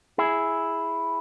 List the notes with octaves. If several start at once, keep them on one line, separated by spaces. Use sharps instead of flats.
E4 G#4